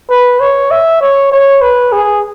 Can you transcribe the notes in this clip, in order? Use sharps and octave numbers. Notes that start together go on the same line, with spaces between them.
B4
C#5
E5
C#5
C#5
B4
G#4